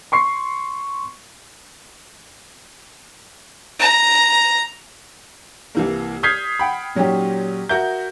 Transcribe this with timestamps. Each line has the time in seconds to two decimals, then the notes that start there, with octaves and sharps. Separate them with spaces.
0.12 C6 C#6 C7
3.79 A#5
5.75 C2 E3 A#3
6.23 D#6 F6 G6 G#6 B6 C7
6.59 F#5 G5 B5
6.95 A#2 F#3 C#4 D#4 G4
7.69 F#4 A#4 E5 G6